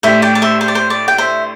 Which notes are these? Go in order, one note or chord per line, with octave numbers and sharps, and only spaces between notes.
A2 A3 D4 G4 C5 E5
D5 G5
D5
C5 E5
C5
D5
C5
D5
G5
C5 E5